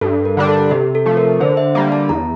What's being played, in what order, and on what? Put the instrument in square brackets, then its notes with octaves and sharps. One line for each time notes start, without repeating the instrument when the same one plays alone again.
[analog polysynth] G2 [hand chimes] A4
[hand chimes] A#4
[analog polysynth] D3 G3 D4
[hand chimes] A4
[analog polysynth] C3 [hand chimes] G4
[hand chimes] A4
[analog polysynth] F3 A3
[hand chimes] A#4
[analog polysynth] D3 [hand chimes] C5
[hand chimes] E5
[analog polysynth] G3 A#3 [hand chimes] F5
[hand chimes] A5
[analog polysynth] E2 [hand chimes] A#5